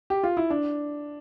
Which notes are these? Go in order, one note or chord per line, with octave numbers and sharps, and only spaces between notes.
G4
F4
E4
D4